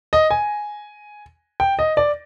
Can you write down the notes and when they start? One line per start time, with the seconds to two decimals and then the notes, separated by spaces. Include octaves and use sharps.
0.13 D#5
0.31 G#5
1.60 G5
1.79 D#5
1.97 D5